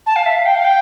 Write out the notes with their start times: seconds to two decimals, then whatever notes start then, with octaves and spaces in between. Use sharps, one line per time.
0.06 A5
0.16 F5
0.26 E5
0.35 F5
0.45 G5
0.55 F5
0.64 G5